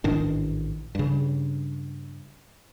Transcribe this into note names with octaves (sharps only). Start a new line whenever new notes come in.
A1 G#2 D#3 D4
G2 C#3